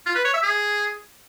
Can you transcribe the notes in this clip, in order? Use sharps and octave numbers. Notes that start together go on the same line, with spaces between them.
F4
B4
C#5
E5
G#4